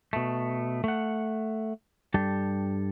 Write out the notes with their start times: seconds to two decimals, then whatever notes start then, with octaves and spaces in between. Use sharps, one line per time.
0.13 B2 A3
0.84 A3 F#5
2.14 G2 G3 G4 A4